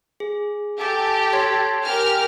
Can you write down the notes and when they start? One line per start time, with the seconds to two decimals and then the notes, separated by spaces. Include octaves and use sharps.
0.20 G#4
0.80 G4 A4 G#5 D6
1.33 C#5 C6 G#6
1.85 G4 A#4 G#5 F6